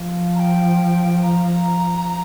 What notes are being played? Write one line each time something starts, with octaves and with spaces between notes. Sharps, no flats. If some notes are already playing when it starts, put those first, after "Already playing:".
Already playing: F3
A#5
G5
A#5